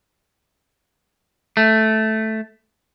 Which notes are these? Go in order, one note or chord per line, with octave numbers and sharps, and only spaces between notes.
A3